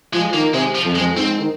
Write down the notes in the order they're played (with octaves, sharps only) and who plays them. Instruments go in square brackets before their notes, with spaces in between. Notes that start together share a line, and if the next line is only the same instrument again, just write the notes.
[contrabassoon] F3 [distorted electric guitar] G#3
[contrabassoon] D#3 [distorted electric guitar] A#3
[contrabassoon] C3 [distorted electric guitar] G#3
[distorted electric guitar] F3
[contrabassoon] F2
[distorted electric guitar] G#3
[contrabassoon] F2
[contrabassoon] G#2 [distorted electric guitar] C4
[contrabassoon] D#3